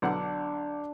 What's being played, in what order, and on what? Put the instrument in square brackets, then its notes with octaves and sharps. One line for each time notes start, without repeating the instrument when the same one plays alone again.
[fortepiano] B1 D3 F#5 [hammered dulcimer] D4 D6